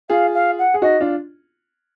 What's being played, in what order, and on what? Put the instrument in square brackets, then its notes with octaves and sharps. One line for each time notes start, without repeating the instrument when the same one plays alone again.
[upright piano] F4 G#4 [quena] F5
[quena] F5
F#5
[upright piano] G#4
[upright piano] D#4 F#4 [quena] D#5
[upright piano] D4 F4